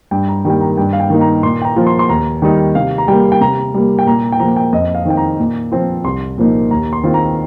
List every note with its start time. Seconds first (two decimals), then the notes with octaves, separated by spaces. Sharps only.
0.11 G2 G5
0.28 A#5
0.45 D#3 G3 A#3 G5
0.61 A#5
0.77 G2 G5
0.93 F5
1.00 G5
1.10 D#3 A#3 D#4
1.21 A#5
1.43 A#2 C6
1.62 G5
1.65 A#5
1.76 F3 A#3 F4
1.87 C6
1.99 C6
2.09 D#2 A#5
2.42 D#3 G3 D#4
2.75 C3 F5
2.98 A#5
3.08 G3 A#3 G5
3.32 G5
3.41 C3 A#5
3.74 G3 A#3
3.99 G5
4.06 A#2 A#5
4.32 G5
4.40 F3 A#3 A#5
4.56 G5
4.73 F2 D#5
4.95 F5
5.05 D#3 C4 D#4 G5
5.17 A#5
5.39 A#2
5.72 F3 C4 F4
6.04 C2 C6
6.38 A#2 F3 A#3 D#4
6.71 D#2 A#5
6.93 C6
7.04 D#3 C4 F4
7.14 A#5